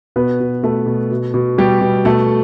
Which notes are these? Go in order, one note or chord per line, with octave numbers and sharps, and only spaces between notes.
B2 B3 B4
B2
B2 A3 A4
B2
B2
B2
B2 G3 G4
B2
B2 A3 A4